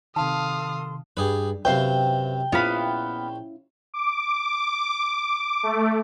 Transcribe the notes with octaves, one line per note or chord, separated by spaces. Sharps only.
C3 D#3 A4 F5 A5 C6 D#6
G2 G4 G#4 B4
F#2 C3 B4 C5 F5 G5
A#1 B3 C#4 E4 F4 F5 B5
D6
A3